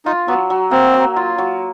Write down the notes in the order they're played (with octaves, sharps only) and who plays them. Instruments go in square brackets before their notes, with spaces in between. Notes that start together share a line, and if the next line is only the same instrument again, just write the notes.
[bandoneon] D#4 [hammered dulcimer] F4
[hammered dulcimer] F#3 [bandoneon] B3
[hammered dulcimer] F#3
[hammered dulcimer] A#3 [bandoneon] C4
[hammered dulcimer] F#3
F4
F#3